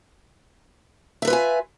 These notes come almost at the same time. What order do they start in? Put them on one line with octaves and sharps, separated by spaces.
E5 A4 B4 F4 G#5